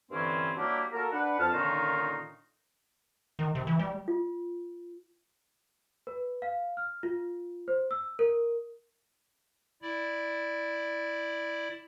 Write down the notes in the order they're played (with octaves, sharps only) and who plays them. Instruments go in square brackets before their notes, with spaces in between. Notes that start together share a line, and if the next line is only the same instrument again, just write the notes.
[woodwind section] G2 D3 E3 C4 C#4
F#3 G3 A#3 D4 E4 G4
A#3 F#4 A4 A#4
D4 B4 F#5
F2 A5 F6
A#2 D3 D#3 C#4 D#4 F4
[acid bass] D#3
C3
E3
G3
[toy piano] F4
[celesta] B4
F5
F6
F4
C5
E6
A#4
[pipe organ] E4 D5